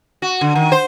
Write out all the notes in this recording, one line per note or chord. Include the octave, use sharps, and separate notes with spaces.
F#4
D3
D#3
C5